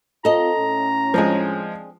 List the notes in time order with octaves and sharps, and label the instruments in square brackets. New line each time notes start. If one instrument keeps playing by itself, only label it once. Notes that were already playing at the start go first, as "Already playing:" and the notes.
[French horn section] C4 F4 [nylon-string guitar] A4 D#5 [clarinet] A#5
[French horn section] A2 C#4
[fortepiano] F3 G#3 [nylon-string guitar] C4 D4 G#4